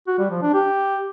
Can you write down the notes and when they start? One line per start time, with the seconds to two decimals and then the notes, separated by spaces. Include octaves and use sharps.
0.07 F#4
0.19 G3
0.31 F3
0.42 D4
0.54 G4